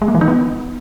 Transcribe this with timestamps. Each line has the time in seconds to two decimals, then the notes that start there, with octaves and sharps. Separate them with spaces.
0.02 G#3
0.08 A#3
0.15 E3
0.21 D#4
0.28 B3